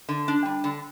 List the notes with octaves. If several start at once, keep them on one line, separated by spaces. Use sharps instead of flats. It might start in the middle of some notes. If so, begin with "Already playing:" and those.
D3
D4
G3
D3